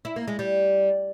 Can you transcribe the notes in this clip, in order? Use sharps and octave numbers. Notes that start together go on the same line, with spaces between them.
E4
A#3
G#3
G3